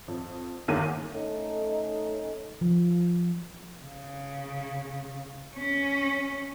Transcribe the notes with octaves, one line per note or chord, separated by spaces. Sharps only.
F2
G1 E2 D#3 A#3 D6 D#7
A3 C#4 D#4
F3
C#3
C#4